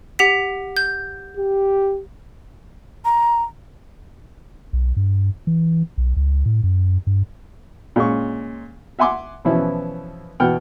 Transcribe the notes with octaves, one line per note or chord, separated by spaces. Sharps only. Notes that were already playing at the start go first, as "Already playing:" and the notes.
G4 F#5 B6
G6
G4
A#5
B1
G2
E3
B1
C#2
A2
F#2
G2
A#2 G#3 C#4 C#6
E5 F#5 G#5 C6 D6
B2 E3 F3 B3 C#4 E4
B2 E3 F#5 G5 F6